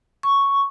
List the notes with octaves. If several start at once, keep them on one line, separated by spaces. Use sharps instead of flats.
C#6